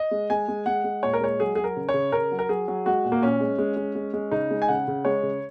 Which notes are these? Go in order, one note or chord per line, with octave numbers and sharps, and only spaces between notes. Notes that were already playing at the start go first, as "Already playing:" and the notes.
Already playing: D#5
G#3
G#3 G#5
G#3
G#3 F#5
G#3
A#2 C#5
A#4
G#3 C#5
F#3 G#4
G#4
F#3
A#4
C#3
C#5
C#3
C#3 A#4
F#3
A#4
F#3 G#4
F#3
G#3 F#4
A#2
A#3
A#2 C#4
G#3
G#3
G#3
G#3
G#3
C#3 D#4
G#3
G#5
C#3 F#5
C#3
G#3 C#5
C#3